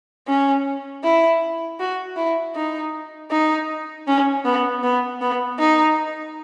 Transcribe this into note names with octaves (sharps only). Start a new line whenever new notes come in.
C#4
E4
F#4
E4
D#4
D#4
C#4
B3
B3
B3
D#4